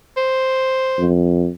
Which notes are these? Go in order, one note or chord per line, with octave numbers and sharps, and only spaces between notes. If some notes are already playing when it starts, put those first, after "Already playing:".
C5
F2